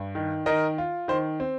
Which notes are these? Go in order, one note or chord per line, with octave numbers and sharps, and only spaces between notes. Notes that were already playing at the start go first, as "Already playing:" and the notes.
Already playing: G2
D#3
D#3 A#4 D#5
F4
D#3 C5
C4